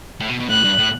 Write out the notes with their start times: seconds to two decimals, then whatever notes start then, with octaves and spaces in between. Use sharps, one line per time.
0.20 A2
0.29 B2
0.40 B2
0.49 A2 F#6
0.64 G2
0.79 A2